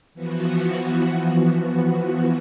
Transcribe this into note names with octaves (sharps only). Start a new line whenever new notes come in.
E3 F3 B3 F#4